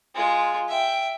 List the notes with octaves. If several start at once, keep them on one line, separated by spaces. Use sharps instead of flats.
G#3 F4
E5 G5